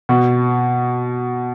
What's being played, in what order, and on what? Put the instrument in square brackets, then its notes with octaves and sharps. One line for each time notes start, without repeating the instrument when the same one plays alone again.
[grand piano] B2